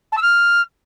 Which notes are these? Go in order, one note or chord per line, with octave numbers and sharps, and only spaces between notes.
A5
E6
F6